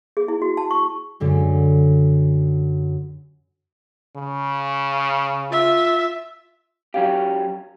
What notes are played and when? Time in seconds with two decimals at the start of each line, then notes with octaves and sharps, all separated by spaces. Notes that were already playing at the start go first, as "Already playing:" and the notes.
0.17 G#4
0.28 E4
0.42 F#4
0.57 A5
0.71 C#6
1.20 F#2 D3 G#3
4.16 C#3
5.50 F4 E5
6.94 F#3 C#4 G4 F5